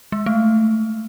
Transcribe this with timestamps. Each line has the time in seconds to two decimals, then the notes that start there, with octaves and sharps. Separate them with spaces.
0.12 G#3
0.26 A3